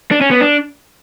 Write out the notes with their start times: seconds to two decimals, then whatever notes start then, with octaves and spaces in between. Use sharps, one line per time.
0.11 D4
0.21 C#4
0.31 B3
0.41 D4